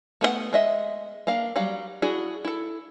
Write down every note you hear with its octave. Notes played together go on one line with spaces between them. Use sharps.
A3 B3 G#4 F#5
G#3 D#5 E5
A#3 D4 F5
F#3 G3 F5
D4 E4 F#4 G#4
E4 A4